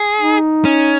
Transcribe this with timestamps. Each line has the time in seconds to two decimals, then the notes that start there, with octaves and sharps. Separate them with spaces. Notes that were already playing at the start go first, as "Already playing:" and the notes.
Already playing: G#4
0.18 D#4
0.65 C#4